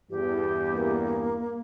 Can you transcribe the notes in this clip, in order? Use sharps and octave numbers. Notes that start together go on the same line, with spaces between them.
E2 G2 G4
A#3